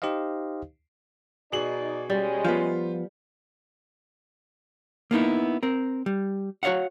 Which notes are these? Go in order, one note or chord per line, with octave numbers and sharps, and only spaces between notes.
D#4 G4 C5 D#5 F5
B2 D#4 G#4 D5 F#7
G3 G#3 C#4
F3 B3 F4
A#3 B3 D#4 E4
C4 A#4
G3
F#4 C#5 D#5 F5 F#5